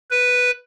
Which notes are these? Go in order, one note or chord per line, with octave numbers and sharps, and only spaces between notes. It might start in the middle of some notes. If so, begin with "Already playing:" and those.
B4